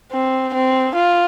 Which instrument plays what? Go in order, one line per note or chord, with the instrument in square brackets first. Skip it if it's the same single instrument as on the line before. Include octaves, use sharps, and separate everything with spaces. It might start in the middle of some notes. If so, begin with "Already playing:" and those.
[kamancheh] C4
C4
F4